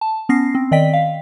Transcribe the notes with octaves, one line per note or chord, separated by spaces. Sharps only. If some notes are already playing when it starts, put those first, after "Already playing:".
A5
B3 C#4 A#6 C7
C4
D#3 D5 D#5 G5 B6
F5